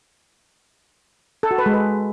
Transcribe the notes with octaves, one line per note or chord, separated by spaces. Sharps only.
A4
F#4
B4
G#3
B4